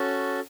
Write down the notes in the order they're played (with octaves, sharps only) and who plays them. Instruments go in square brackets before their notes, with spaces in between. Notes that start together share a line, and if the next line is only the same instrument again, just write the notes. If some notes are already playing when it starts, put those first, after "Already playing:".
Already playing: [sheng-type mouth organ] C#4 F#4 A4